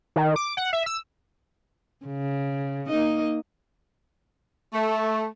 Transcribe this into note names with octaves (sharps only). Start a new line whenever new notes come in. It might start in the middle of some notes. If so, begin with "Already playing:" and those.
D#3
D6
F#5
E5
E6
C#3
A#3 D#4 D#5
A3